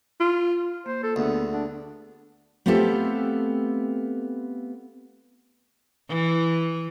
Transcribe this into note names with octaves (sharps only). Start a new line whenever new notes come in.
F4
A#3 C5
A4
D2 B3 D4 G#4 E5
D4 F#5
A3 B3 C4 F4 G4 A4
E3